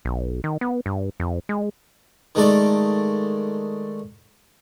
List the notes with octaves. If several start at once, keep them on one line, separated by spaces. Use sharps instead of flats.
B1
D#3
B3
G2
F2
G#3
D#3 G#3 A3 A4 D5